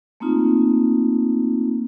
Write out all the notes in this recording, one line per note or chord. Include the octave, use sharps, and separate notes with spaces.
A3 A#3 C4 D#4 F4